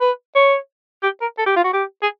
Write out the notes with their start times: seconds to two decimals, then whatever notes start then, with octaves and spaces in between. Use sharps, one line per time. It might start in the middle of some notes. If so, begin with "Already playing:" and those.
0.01 B4
0.36 C#5
1.03 G4
1.22 A#4
1.39 A4
1.46 G4
1.56 F4
1.64 F#4
1.73 G4
2.03 G#4